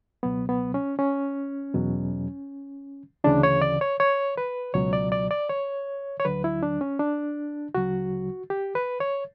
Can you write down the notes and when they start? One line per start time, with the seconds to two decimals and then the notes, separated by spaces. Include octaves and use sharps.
0.23 C#2 B2 F#3 B3
0.49 B3
0.74 C#4
0.99 C#4
1.74 E2 B2 F#3
3.24 D2 C#3 E3 D4
3.43 C#5
3.62 D5
3.81 C#5
4.00 C#5
4.37 B4
4.74 C#2 B2 F#3 C#5
4.93 D5
5.12 D5
5.31 D5
5.49 C#5
6.20 C#5
6.25 D2 D3 F#3 B4
6.44 E4
6.63 D4
6.81 C#4
6.99 D4
7.75 D2 C#3 F#3 F#4
8.50 G4
8.75 B4
9.00 C#5